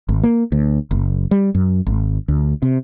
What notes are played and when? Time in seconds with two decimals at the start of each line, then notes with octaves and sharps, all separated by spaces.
0.09 G#1
0.23 A#3
0.52 D2
0.91 F#1
1.31 G3
1.55 F#2
1.87 G#1
2.28 D2
2.62 C3